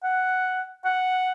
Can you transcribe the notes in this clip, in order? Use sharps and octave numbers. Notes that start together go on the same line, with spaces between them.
F#5
F#5